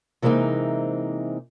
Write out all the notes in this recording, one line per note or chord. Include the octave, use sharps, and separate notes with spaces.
C3 E3 G#3 A#3 C4 D#4